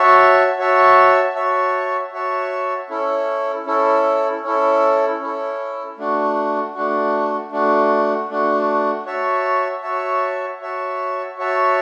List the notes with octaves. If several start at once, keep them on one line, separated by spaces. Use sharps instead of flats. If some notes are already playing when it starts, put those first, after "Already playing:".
Already playing: F#4 C#5 E5 A5
F#4 C#5 E5 A5
F#4 C#5 E5 A5
F#4 C#5 E5 A5
C#4 E4 A4
C#4 E4 A4
C#4 E4 A4
C#4 E4 A4
A3 D4 F#4
A3 D4 F#4
A3 D4 F#4
A3 D4 F#4
F#4 C#5 E5 A5
F#4 C#5 E5 A5
F#4 C#5 E5 A5
F#4 C#5 E5 A5